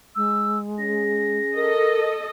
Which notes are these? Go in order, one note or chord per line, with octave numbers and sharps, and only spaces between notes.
G#3 E6
C#4 G#4 A#6
A4 A#4 D#5